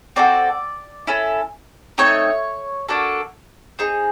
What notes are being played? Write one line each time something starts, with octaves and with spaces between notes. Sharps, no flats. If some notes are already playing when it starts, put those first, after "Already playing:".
C4 D#4 F#4 A4 D5
C#4 E4 A4
A3 C4 D#4 C#5
A#3 D4 F#4 A4
C4 D#4 G#4